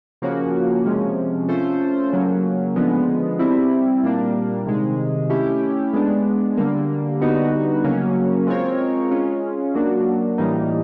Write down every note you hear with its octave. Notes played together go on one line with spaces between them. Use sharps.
C#3 F3 A#3 C#4 F#4
C3 F3 G#3 C#4
A3 C#4 F4 A4 C5
C#3 F#3 A#3 C#4
D3 F3 G#3 B3
G3 C4 E4
A#2 G3 A#3 D4
C3 D#3 G#3
A3 C#4 E4 G4
G#3 B3 D4
D3 G3 A#3
D3 G3 B3 D#4 F#4
C#3 F#3 A#3 C#4
G#3 C4 F4 A#4 C#5
G#3 C#4 F4
F#3 A#3 D4 F#4
A2 E3 G3 A#3 D#4